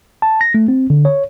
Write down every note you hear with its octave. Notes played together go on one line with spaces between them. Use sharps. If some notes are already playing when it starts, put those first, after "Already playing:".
A5
A#6
A3
C4
D3
C#5